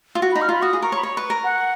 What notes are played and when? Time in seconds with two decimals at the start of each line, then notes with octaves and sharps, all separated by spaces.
0.15 F4
0.22 F#4
0.32 B5
0.35 D#4
0.42 F6
0.49 F4 B5
0.62 F#4 D#6
0.73 G#4
0.82 A#4 C#6
0.92 C#5
0.97 B5
1.03 C#5 C#6
1.17 B4
1.30 A#4
1.44 F#5